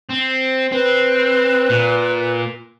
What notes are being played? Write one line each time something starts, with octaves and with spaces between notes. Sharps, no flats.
C4
C4 B4
A#2